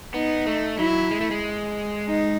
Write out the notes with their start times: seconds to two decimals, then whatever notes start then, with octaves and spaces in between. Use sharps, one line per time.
0.14 B3 D#4
0.46 A3
0.78 F#3 E4
1.11 G#3
1.21 A3
1.31 G#3
2.07 D#4